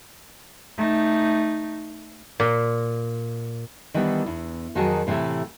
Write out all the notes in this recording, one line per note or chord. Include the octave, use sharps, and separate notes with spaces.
A3 D#4
A#2
D#3 E3 G3 B3 D4
E2
F2 D#3 F#3 F#4 G#4 A5
A2 C3 E3 G#3 A3